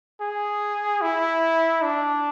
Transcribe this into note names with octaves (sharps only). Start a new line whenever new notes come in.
G#4
E4
D4